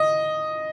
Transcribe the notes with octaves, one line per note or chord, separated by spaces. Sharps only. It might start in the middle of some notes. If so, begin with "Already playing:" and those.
Already playing: D#5